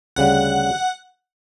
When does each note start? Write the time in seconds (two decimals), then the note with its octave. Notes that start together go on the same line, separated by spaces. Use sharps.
0.16 D2 C#3 G3 F#5